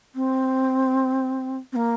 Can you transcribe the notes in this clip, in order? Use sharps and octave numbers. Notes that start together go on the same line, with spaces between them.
C4
C4
A#3